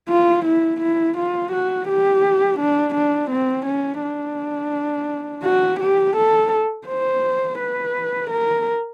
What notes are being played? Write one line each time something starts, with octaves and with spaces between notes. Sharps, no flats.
F4
E4
E4
F4
F#4
G4
D4
D4
C4
C#4
D4
F#4
G4
A4
C5
B4
A#4